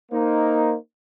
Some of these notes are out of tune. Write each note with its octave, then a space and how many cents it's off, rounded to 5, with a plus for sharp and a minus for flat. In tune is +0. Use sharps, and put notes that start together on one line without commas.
A#3 +0 D#4 +0 C5 +0